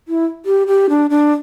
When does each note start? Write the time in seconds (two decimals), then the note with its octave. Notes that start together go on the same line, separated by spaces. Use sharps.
0.08 E4
0.46 G4
0.67 G4
0.89 D4
1.10 D4